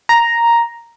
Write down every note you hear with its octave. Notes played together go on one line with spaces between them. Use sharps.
A#5